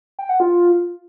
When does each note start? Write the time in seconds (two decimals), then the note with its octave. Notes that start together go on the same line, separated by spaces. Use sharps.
0.19 G5
0.29 F#5
0.40 F4